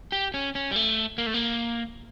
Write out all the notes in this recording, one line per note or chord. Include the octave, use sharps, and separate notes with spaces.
G4
C#4
C#4
G3
A3
A#3
A3
A#3